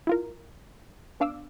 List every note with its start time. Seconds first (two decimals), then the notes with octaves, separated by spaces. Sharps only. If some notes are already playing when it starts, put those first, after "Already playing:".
0.07 E4 F4 A#4
1.20 B3 D4 F5 D6 E6